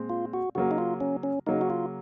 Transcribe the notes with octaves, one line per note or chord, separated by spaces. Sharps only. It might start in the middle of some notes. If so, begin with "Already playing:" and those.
Already playing: A#2 G#3 C4
F4
F#4
C#3 F#3 A#3 F#4
D#4
F4
C#4
C#4
C#3 F#3 A#3 D#4
F#4
F4